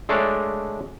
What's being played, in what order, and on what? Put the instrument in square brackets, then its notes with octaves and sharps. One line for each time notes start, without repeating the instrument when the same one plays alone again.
[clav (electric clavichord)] G#3 A3 D4 C#5 D5